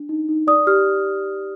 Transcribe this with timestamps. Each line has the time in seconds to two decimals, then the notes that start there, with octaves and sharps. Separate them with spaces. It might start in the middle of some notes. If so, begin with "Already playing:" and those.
Already playing: D4
0.09 D#4
0.29 D#4
0.47 D5 D#6
0.67 G4 F6